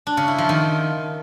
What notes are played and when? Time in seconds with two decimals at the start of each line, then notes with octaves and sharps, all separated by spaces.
0.07 D4
0.17 C#3
0.28 E4
0.38 F3
0.49 D#3